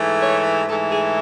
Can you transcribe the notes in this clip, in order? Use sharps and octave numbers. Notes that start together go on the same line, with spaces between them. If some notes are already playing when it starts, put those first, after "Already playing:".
Already playing: G#2 E3 A3
C#5
G#2 E3 A3 A4
G#4